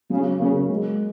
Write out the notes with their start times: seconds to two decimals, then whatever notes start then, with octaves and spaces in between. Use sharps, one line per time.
0.10 C#3 F#3
0.40 C#3 A#3
0.69 G#3